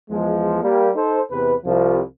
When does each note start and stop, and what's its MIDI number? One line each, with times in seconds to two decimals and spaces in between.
0.10 0.59 40
0.10 0.59 53
0.10 0.59 56
0.62 0.90 55
0.62 0.90 58
0.96 1.21 63
0.96 1.21 69
0.96 1.21 72
1.32 1.54 40
1.32 1.54 48
1.32 1.54 71
1.66 2.00 36
1.66 2.00 53